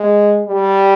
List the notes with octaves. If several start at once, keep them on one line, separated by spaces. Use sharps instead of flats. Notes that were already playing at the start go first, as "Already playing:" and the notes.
Already playing: G#3
G3